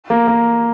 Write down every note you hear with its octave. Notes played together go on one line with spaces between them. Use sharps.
A#3
A#3